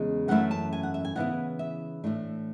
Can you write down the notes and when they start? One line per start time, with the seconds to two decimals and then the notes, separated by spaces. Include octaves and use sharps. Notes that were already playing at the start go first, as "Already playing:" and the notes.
Already playing: E2 C#3 G#3
0.28 F#2 E3 A3 C#4 E4 F#5
0.51 A5
0.73 G#5
0.83 F#5
0.94 E5
1.05 G#5
1.16 C#3 E3 B3 E4 F#5
1.59 E5
2.04 A2 E3 A3 D4